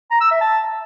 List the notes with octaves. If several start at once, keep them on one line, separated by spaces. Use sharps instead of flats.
A#5
E6
E5
A5